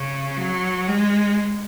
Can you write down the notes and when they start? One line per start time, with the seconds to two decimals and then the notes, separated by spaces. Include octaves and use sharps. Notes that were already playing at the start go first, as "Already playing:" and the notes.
Already playing: C#3
0.37 F#3
0.88 G#3